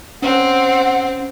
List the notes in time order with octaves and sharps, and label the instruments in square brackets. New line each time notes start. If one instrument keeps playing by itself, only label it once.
[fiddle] C4 [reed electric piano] C#4 [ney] F#5